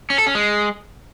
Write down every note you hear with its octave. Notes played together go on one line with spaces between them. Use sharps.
C#4
A4
C#4
G#3